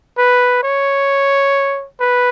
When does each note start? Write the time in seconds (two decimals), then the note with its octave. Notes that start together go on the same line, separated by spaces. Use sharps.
0.18 B4
0.63 C#5
2.00 B4